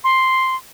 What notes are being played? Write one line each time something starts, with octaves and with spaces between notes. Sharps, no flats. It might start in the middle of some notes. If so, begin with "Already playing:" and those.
C6